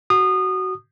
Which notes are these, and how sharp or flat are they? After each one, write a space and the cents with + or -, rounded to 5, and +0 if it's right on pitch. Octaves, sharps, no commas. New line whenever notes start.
F#4 +15 D#6 -25